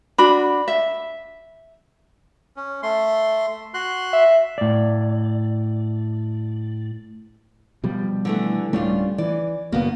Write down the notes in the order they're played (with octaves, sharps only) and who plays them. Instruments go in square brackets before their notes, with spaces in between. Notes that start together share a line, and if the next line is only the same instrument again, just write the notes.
[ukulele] D4 F#4 B5
E5
[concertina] C#4
A3 C6
F#4 C6 F#6
[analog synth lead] E5
[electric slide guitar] A2 D5
[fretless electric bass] B2 F3 G3
[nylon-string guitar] D3 E3 A3
[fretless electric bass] D1 G3 A3 [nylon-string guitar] C#4 D4 F4
[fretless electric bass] E3 [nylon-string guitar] D5
[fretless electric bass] F#1 B2 [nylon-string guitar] A#3 B3